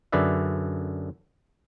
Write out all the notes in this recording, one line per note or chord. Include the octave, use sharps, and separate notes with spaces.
F#2 D3 G#4 B4 D5 E5